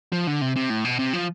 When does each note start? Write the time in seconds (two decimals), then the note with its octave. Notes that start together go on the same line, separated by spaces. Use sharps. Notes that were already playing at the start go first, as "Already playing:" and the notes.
0.13 F3
0.27 D3
0.41 C3
0.56 C3
0.70 A2
0.85 B2
0.99 C3
1.13 F3